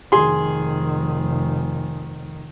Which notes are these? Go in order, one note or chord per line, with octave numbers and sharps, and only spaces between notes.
F1 D#3 G#4 C6